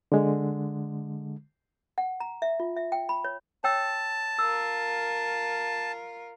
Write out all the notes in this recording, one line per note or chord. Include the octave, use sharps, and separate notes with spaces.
D3 G#3
F#5
A#5
E5
F4
E5
G5
B5
C#5
C#5 G5 A5 E6
F4 A#4 E6